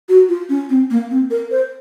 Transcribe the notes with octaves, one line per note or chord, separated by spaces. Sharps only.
F#4
F4
C#4
C4
A#3
C4
A#4
C5